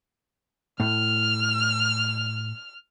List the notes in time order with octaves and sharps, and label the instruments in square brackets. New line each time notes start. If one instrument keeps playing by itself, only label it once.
[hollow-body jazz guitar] A2 [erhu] F6